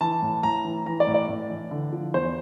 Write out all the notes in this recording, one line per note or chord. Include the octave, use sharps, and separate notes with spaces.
E3 A5
A2
A2 A#5
E3
E3 A#5
D5
A2
D5
A2
E3
D3
F3
E2 C5